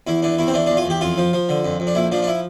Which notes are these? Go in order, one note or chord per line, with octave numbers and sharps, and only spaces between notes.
E2 E4
E3 D4
E2 E4
C4
E3 D4
D4
E2
F4
E2 G4
F2 F4
F3
F3
D3
F2
F2
D4
A#1 E4
F3 D4
D4
E4